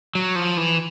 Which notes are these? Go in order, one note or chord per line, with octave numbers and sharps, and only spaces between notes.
F#3
F3
E3